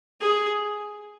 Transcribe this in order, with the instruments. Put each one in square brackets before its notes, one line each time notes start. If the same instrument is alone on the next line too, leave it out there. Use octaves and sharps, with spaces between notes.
[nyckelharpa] G#4